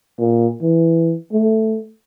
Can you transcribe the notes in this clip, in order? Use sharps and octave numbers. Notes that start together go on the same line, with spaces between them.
A#2
E3
A3